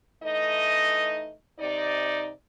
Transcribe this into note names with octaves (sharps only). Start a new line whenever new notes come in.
E3 A3 D#4 D#5
C3 D#4 D5